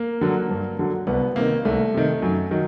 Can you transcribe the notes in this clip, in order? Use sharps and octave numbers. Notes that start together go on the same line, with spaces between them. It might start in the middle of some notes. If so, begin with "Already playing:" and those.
Already playing: A#3
D3 F#3
G2
D3 F#3
C2 B3
C3 D#3 A#3
C2 A3
C3 D#3
F#2
D#3 F#3